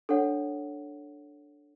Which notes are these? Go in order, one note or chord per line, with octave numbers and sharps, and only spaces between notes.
D4 A4 C#5 F#5